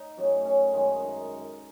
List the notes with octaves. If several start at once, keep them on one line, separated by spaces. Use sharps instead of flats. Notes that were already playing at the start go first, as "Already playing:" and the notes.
Already playing: D#4
F#2 C#3 F#3 A3
C#4
F#2 D#3 G#3
D#4